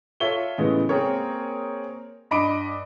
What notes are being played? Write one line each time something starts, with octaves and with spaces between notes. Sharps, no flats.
F4 A4 C#5 E5 G7
A2 C#3 E3 G#3 B3
A#3 C4 G#4 A#4 C#5
G2 D#5 B5 D6 D7